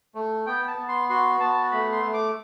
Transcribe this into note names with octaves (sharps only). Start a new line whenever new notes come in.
A3
B3 G5
A5
B3
C6
F#4 C6
B3 A5
A3 B5
C6
A3
D6